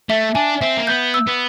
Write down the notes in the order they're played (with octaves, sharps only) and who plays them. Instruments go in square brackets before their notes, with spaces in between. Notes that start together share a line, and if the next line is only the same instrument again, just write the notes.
[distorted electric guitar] A3 [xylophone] E5
[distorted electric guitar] D4 [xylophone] G#5
[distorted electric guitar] C4 [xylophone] E5
[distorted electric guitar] A#3
[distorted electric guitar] B3 [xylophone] G6
[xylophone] E6
[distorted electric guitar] B3